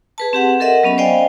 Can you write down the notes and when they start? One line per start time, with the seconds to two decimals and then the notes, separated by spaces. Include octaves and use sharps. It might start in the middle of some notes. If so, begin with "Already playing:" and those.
0.18 G#4 B4 A5
0.33 C4 G4 F#5
0.60 A4 A#4 D#5 E5 F#5
0.83 F#3 B3 C#4 B5
0.98 C5 D5 D#5 F5 G5 G#5